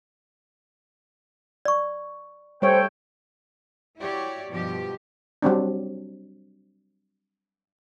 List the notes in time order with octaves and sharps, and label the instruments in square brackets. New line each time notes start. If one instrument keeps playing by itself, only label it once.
[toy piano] D5 C#6
[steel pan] G3 C#5 [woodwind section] A3 G5 [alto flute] C5
[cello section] E4 F#4 G4 C#5 D5
G2 B2 F3 G4
[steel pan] F#3 G3 C4 D4